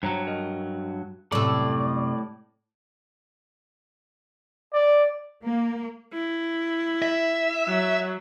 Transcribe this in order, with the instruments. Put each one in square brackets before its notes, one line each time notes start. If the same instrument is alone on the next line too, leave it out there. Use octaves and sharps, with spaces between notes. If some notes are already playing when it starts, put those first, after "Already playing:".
[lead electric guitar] G2 F#3 [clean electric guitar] C5 C#5 A#5
[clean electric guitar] A#4 D#5
[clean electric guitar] F#2 C3 G3 [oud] A2 A4 [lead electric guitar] D5
[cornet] D5
[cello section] A#3
[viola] E4
[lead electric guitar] E5
[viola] F#3